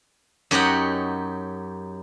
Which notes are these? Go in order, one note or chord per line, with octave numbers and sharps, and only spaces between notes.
F#2 D#4 G4 C#5 D#5 F#5